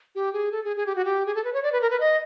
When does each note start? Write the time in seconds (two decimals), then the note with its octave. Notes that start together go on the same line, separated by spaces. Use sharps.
0.15 G4
0.33 G#4
0.52 A4
0.64 G#4
0.77 G#4
0.86 G4
0.96 F#4
1.05 G4
1.26 G#4
1.35 A4
1.44 B4
1.54 C#5
1.63 D5
1.72 B4
1.82 A#4
1.91 B4
2.00 D#5